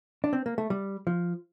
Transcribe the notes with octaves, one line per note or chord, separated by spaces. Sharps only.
D4
C4
A#3
A3
G3
F3